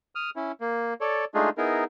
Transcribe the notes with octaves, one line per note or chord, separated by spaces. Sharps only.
D#6 F6
C#4 E4
A#3
A4 C#5 D5
G#3 A3 D4 D#4 F4 G#4
B3 D#4 E4 G#4 A#4